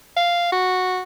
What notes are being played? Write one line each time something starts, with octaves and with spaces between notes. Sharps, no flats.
F5
F#4